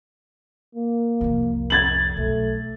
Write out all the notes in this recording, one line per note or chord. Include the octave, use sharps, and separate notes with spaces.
A#3
C2 F2
G#6 A6 F#7
B1 A3